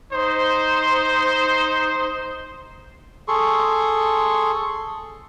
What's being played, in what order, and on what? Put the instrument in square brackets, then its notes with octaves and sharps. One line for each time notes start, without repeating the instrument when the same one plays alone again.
[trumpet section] D#4 C5
[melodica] G#4 A4 C6 C#6